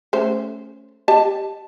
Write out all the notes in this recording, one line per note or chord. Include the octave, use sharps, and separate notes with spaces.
A3 C#4 C5
G4 D#5 A5